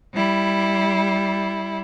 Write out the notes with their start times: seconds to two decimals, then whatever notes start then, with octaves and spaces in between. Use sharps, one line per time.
0.12 G3 E4